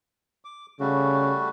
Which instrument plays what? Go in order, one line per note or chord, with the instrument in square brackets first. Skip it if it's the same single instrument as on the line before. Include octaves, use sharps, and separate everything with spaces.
[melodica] D6
[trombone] C#3 [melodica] G3 A3 F#4